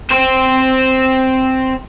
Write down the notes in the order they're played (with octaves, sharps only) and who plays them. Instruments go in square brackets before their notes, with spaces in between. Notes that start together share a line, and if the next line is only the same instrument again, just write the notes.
[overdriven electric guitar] C4 C5